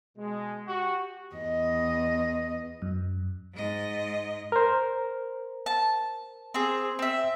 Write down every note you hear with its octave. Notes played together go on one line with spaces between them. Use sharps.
B2 G#3
F#4 G4
E2 D#5
F#2
G#2 D#5
A#4 C5
A5
C4 G#4
C4 E5